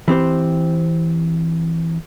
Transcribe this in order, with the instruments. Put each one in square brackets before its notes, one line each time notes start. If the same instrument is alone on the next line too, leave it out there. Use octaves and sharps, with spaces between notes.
[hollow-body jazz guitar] E3 C4 G4 C5